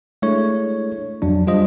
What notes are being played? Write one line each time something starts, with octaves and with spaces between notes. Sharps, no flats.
G#3 A3 D4 E4 C#5
F2 F#3 D4
G3 F4 C5 D#5